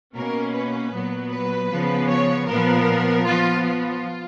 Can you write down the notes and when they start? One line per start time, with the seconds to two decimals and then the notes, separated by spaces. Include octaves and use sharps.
0.15 B2 A#3 C#4 A#4
0.53 B4
0.92 A#2 F#3 B3
1.31 B4
1.70 C#3 F3 B3
2.09 C#5
2.47 A#2 F3 B3 A#4
3.25 F3 B3 F4
3.64 F4